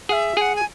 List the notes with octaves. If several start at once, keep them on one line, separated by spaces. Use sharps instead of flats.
G#4 E5 F#5
G#4 F#5 G#5
G#5